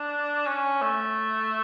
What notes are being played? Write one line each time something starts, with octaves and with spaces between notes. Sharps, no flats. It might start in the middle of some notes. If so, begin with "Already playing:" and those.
Already playing: D4
C#4
A3